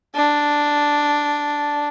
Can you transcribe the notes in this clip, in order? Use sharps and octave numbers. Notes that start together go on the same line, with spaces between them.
D4